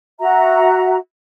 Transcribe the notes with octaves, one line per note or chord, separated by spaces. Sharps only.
F#4 E5 A#5